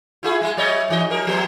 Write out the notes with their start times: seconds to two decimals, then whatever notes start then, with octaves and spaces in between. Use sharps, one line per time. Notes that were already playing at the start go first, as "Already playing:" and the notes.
0.23 E4 F4 G#4
0.41 G3 G#3
0.57 F#3 C#5 D#5
0.88 G#2 E3 D#5
1.10 F3 A#4
1.27 F3 B3